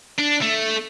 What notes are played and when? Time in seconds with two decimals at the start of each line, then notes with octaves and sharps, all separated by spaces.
0.18 D4
0.41 A3